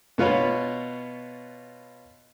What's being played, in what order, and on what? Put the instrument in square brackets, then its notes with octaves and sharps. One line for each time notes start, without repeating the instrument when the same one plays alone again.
[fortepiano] B2 B3 F4 C#5 B5